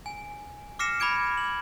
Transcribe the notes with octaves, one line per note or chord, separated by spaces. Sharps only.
G#5
D6 F6 A#6 C7 C#7 E7
B5 D6 G#6 D7
F#7